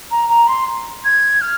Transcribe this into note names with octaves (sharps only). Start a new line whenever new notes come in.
A#5
A#5
C6
G#6
F6